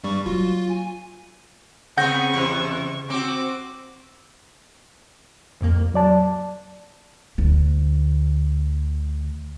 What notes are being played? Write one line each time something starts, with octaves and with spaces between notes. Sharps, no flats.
G2 G3 C#6
F#3 A#3 F4 F#4
G#5
C#3 B3 C4 G#4 F#5 C#6 G6 A#6
E2 C3
C4 F#4 D6
C2 F2 A#3
F#3 D5 A5
D2 D3